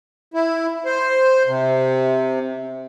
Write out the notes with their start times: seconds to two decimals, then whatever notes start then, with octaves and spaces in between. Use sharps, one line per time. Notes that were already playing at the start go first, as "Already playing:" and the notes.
0.34 E4
0.85 C5
1.47 C3